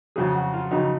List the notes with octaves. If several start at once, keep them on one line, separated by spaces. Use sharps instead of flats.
F2 C#3 F#3 G#4
F#4
F4
F2 C#3 F#3 D#4